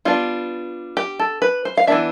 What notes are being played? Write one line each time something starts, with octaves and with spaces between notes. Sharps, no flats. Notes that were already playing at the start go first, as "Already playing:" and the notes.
G3 B3 D4 F4
G4
A4
B4
C5
F5
E3 B3 D4 E5